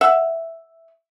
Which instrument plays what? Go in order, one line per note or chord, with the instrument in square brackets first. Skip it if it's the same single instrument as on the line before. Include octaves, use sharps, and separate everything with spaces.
[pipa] E5 F#5